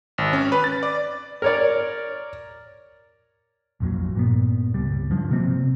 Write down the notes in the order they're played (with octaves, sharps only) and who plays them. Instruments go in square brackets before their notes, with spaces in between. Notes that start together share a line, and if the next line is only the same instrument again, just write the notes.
[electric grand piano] G#1
C#4
B4
A6
D5
[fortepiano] A#4 C#5 D5
[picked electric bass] A#1 F2 A#2 F#3
G2 A#2 B3
C#2 G3
G2 F3
C3 A#3 C4